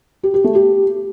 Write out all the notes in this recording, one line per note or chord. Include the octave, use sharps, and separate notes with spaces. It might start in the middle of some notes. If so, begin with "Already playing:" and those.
G4
G4
A3
G4